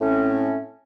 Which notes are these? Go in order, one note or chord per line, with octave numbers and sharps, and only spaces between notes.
A2 A3 C4 C#4